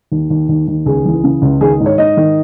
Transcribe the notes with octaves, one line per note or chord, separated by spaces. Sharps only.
D#2
D#2
D#2
D#2
C#2 G#4
E3
C#3
C#2
D#3 G#4
G#2
C#5
G#2 D#5
D#3